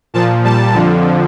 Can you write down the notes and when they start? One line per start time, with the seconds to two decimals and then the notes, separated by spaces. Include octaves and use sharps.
0.14 A#2 F3 A5
0.44 A#2 G3 A5
0.74 F2 D3 F3